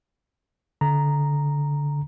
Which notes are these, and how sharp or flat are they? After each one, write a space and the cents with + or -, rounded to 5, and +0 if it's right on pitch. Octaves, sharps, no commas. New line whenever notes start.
D3 -20 A#5 +0